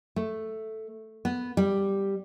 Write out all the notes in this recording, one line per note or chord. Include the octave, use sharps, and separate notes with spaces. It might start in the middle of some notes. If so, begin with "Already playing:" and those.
A3
B3
G3